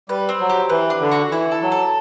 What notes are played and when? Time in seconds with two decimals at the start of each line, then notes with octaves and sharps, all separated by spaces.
0.09 G3 B4
0.29 C4
0.40 F#3
0.50 G4
0.70 E3 B4
0.90 D4
1.01 D3
1.11 F#4
1.31 E3 E4
1.52 A4
1.62 F#3
1.72 A4